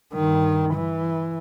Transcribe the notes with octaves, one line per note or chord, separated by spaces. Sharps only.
G2 D#3
E3